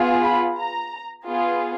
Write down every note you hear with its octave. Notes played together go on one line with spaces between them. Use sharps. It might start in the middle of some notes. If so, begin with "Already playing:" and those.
Already playing: B3 F4 G#4
B5
A#5
B3 F4 G#4